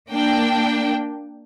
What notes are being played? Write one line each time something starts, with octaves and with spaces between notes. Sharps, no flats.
A#3 D4 G5